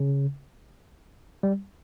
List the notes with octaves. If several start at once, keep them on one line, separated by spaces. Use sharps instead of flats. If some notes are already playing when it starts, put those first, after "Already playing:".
Already playing: C#3
G3